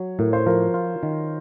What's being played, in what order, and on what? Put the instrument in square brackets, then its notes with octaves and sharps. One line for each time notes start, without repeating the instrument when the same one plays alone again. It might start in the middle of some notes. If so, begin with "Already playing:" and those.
Already playing: [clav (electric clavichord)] F#3 [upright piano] C#5
[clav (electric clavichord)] A2 [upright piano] A#4
[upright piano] C5
[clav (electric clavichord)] F3 [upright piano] A#4
[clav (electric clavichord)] F4
D#3